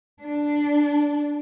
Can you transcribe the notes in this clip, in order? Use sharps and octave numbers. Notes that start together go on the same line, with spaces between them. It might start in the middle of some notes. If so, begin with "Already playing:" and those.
D4